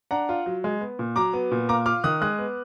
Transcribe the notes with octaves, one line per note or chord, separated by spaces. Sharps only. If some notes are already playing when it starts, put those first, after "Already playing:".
D4 F#5 A#5
F4
F#3
G#3
B3
A#2
F#3 A#5 D6
B3
A#2
A#3 A#5 D6
F4 D6 F6
D#3 D#6 F#6
G#3 D#6 F#6
B3